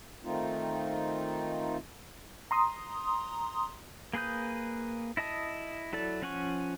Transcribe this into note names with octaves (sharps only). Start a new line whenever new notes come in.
D#3 A3 C4 D#4 F4
A#5 C6 D#6
A#3 G#4 B4 D#6 G6
E4 D#5 A5 D#6
F#3 E4 A4 D5
F3 C#4 F#5 G#5 C#6